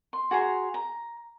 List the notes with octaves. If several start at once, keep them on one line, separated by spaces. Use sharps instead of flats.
C6
F#4 G#4 A#5 C6
A#5